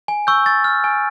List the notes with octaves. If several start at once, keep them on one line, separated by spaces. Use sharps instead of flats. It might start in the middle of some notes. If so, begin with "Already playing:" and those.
G#5
C#6 E6 G6
C#6 A6
F6
G#5